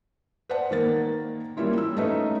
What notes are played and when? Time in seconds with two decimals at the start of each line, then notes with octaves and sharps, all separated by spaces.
0.49 B4 C5 D5 F#5 A5
0.71 D#3 A#3 A6
1.57 E3 G3 A#3 C#4 E4 F4
1.78 E6
1.97 A3 C#4 D#4 B4 E5